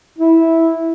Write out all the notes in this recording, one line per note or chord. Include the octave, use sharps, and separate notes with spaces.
E4